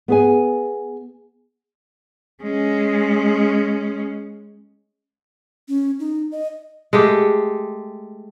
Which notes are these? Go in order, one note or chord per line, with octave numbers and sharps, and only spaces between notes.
B3 G#4 G#5
G#3 C#4
C#4
D#4
D#5
G#3 A3 G4